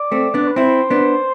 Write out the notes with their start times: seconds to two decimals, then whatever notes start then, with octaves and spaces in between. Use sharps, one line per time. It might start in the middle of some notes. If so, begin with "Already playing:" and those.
Already playing: D5
0.12 A3 C4
0.34 B3 D4
0.47 B4
0.56 C4 E4 C5
0.90 B3 D4